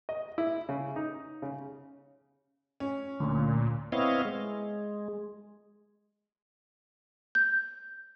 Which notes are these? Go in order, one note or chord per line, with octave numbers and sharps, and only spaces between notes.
D#5
E4
C#3
D#4
C#3
C#4
D2 A#2
B3 C4 E4 C#5 D#5 F5
G#3
G6